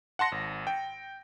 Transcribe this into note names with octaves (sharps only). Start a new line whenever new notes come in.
F#5 A5 C6 A#6 C#7
G#1
G5